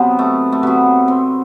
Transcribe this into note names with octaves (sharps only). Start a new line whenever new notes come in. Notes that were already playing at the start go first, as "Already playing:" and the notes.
Already playing: C3 F#3 B3
A3
A3
C3 F#3 B3
C4